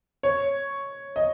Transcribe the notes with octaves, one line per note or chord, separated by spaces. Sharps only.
C#5
D#5